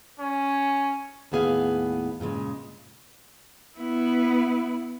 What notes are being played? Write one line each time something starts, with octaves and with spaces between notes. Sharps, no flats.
C#4
D#2 A2 B3 G#4 E5 F5
G2 A#2 C#3 G#3
B3 E4